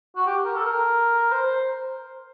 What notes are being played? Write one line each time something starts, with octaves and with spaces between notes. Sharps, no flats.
F#4
G4
A#4
A4
A#4
C5